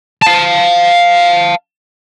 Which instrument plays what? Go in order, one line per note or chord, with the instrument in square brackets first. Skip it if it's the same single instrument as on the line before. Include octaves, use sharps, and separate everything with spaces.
[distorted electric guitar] F5 A5